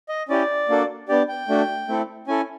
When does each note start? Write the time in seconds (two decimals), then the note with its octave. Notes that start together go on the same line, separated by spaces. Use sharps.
0.09 D#5
0.29 C#4 E4 G4 D5
0.69 A#3 D4 F#4 A4
1.08 B3 D4 G4 D5
1.28 G5
1.48 A3 D4 F#4
1.88 A3 C4 E4 A4
2.27 C#4 E4 A4 G#5